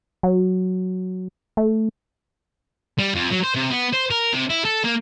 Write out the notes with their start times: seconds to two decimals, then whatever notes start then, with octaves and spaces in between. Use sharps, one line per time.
0.23 F#3
1.57 A3
2.99 G3
3.15 F2
3.31 F#3
3.43 C5
3.55 C3
3.70 B3
3.93 C5
4.11 A#4
4.33 C3
4.49 E4
4.65 A4
4.84 A#3